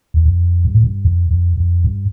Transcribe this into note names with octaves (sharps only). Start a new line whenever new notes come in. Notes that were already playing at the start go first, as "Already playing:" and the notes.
E2
F2
G2
A2
G2
F2
F2
F2
G2